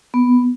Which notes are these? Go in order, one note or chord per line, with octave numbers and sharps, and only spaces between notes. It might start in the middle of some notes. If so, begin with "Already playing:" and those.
B3